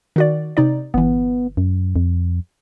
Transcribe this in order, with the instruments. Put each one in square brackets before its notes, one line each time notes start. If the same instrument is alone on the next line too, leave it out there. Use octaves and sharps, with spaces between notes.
[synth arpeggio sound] D#3 F#4 D5
C3 D#4 D5
[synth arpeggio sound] G1 E3 [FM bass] B3
[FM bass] F#2
F2